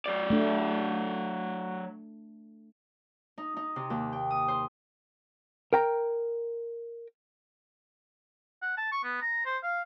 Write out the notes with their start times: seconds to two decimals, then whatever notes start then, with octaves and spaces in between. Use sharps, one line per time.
0.06 F#3 D5
0.30 A3 D4
3.38 D#4
3.57 D#4
3.76 C3
3.90 D#2
4.12 G5
4.31 D#6
4.48 C5
5.73 A#4 G5 A#5
8.62 F#5
8.78 A5
8.92 C#6
9.04 B3
9.22 A#5
9.46 C5
9.63 F5